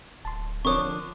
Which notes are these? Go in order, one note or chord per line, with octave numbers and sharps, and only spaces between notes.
D1 A5 C6
D3 F3 C4 D4 A#4 C#5 C#6 D#6